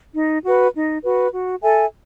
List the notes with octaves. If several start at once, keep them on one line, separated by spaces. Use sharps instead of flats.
D#4
F#4 B4
D#4
F#4 B4
F#4
A4 E5 G#5